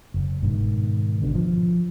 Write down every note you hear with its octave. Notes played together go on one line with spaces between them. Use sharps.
F#1
G#2 B2 D#3
G#1 B2 D3
F3